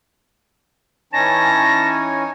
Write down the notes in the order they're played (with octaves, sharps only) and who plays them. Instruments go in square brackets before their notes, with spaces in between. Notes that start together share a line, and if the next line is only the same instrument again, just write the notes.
[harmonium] E3 C#4 [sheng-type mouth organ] D#4 C#5 G#5 [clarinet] A5 [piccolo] A#6